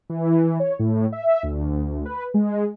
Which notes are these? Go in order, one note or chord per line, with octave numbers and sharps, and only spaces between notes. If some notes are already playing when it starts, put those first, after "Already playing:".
E3
C#5
A2
E5
D2
B4
G#3